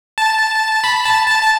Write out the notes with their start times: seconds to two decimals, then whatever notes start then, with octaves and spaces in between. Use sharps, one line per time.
0.18 A5
0.84 B5
1.06 A5
1.27 A5
1.43 A5